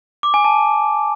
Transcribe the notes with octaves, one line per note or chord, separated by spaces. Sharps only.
D6
G#5
A5